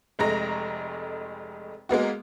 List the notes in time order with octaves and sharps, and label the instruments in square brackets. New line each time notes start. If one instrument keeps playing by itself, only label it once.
[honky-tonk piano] F1 F2 G#3 A3 A#5 A#6
G#3 A#3 B3 F#4